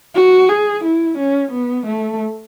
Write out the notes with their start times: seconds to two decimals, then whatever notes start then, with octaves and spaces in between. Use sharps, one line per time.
0.15 F#4
0.49 G#4
0.84 E4
1.18 C#4
1.52 B3
1.86 A3